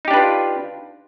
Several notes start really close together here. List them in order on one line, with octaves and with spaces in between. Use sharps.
D#4 G4 D4 B4 F4